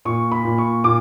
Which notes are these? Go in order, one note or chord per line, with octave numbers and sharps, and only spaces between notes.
A#2 C#6
B5
A#2
C#6
A#2 D6